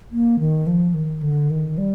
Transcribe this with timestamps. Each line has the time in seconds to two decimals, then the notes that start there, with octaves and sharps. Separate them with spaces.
0.12 A#3
0.39 D#3
0.67 F3
0.94 D#3
1.23 D3
1.50 D#3
1.78 G3